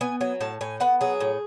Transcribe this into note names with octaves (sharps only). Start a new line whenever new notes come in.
B3 G#5
F#3 G#5
A2 A5
A2 G#5
B3 F#5
F#3 G#4
A2